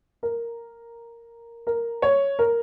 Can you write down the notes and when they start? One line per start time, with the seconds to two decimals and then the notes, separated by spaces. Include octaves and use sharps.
0.23 A#4
1.67 A#4
2.02 C#5
2.39 A#4